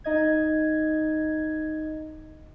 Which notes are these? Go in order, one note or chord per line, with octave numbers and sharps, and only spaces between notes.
D#4 D#5 G#6